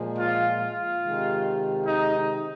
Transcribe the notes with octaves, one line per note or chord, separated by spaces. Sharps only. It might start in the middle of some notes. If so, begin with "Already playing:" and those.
Already playing: A#2 F3 G#3
F4
F4
C3 D#3 G#3
D#4